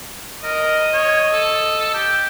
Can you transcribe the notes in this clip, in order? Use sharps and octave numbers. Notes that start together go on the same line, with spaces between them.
A#4 D#5
C#5
A4
G4